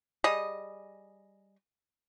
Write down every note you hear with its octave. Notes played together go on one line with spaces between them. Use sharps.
G3 G#4 D#5